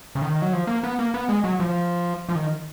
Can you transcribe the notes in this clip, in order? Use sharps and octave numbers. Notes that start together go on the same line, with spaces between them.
C#3
D#3
F#3
F3
A#3
B3
A#3
B3
G#3
F#3
F3
F3
D#3